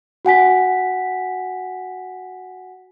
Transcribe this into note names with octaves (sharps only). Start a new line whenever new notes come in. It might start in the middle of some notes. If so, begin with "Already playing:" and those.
F#4 F#5 G#5 B6